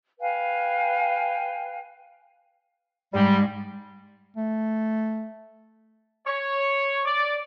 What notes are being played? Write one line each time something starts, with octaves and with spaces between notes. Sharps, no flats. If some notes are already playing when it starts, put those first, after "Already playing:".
B4 F5 G5 G#5
G#2 G3
A3
C#5
D5